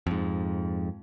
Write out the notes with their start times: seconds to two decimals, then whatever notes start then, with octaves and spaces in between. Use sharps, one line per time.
0.07 F2 G#2